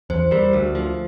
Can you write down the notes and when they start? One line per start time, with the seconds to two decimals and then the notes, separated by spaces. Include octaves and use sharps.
0.10 E2 C5
0.31 G3 A#4
0.53 D2
0.75 F3